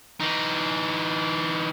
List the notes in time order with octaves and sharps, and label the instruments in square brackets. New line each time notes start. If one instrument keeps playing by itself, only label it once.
[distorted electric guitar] E3 D#4